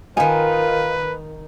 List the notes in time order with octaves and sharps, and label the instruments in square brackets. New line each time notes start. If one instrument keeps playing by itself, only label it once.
[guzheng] D#3 D#4 [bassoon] F4 [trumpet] B4 [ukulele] G#5